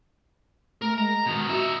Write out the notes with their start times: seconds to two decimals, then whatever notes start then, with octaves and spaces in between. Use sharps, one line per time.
0.82 A3 A#4
0.98 G#3 A#5
1.26 B2 D#3
1.49 D#4 F#4 E5